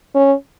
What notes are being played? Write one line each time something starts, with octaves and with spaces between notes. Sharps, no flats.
C#4